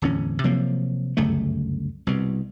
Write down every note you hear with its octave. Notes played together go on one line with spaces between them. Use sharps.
D1 E2 C#4
C3 F3 F#3 A#3
G1 C#2 F#2 A3
C2 B2